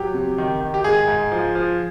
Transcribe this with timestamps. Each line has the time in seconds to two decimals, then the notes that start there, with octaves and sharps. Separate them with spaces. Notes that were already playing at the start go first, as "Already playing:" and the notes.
Already playing: F#3 G4
0.14 C3
0.38 D#3
0.61 D#3
0.74 G4
0.84 G#2 G#4
1.08 G#2
1.32 F3
1.55 F3